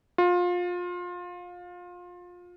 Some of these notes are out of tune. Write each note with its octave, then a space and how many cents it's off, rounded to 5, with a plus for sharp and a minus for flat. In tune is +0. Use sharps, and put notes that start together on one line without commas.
F4 +25